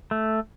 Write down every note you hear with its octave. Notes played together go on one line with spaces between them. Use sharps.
A3